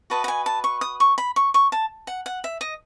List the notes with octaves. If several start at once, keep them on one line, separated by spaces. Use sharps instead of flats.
F#4 B4 D#5 A5
F#5
G#5
A5
C#6
D#6
C#6
B5
C#6
C#6
A5
F#5
F#5
E5
D#5